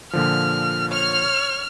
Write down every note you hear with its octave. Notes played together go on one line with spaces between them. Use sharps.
A#2 D3 F3 F6
C#5 F6